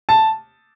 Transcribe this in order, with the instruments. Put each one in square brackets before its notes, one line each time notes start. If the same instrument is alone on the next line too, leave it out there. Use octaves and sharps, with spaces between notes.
[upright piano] A5